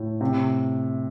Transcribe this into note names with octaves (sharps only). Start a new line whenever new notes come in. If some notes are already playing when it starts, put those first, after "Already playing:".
Already playing: A2
C3